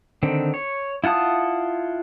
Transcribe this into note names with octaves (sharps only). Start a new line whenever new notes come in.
D3 D#3 C4
C#5
E4 F4 F#5 A5 D#6